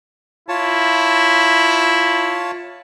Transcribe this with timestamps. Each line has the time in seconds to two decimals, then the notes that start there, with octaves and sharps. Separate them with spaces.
0.49 E4 F4 C#5 A5